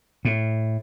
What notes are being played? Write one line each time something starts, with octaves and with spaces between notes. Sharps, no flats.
A2